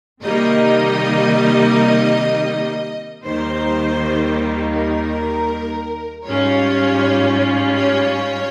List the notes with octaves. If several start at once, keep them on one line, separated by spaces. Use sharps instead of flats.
C3 D#3 G3 A#3 D#4 D#5
D#2 D#3 G3 A#3 D#4 C5
A#4
G#2 G3 C#4 F4 C#5
C#5